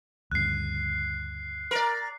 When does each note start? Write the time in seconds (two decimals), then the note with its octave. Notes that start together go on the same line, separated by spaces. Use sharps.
0.32 D2 G2 C#3 F#6 C7
1.71 A#4 D5